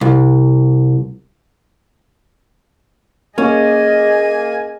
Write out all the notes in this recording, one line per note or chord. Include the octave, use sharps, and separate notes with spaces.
C2
A#3 C#4 G#4 D#5 G#5